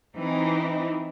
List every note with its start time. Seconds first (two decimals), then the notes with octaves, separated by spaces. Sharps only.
0.16 E3 C4 D#4